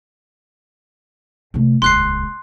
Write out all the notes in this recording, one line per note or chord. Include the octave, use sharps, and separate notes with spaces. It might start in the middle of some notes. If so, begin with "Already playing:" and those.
C3 A3
D#1 C#2 C6 F#6 C7